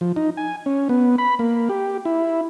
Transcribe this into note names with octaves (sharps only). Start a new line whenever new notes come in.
F3
D#4
G#5
C#4
B3
B5
A#3
G4
E4